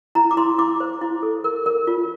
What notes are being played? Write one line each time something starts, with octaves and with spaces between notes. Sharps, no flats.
E4 A#5
D6
E4 C6
E4 D6
C5
E4
A4
A#4
A#4
F4